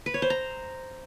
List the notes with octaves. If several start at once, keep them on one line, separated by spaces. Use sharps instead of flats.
B4
C#5
C5
A#5